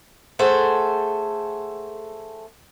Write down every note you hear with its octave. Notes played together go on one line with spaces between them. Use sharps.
A3 G#4 A4 C5 F#5